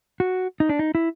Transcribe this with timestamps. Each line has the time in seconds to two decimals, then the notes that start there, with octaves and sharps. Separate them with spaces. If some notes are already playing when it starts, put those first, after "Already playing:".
0.20 F#4
0.60 D#4
0.69 D4
0.79 D#4
0.95 E4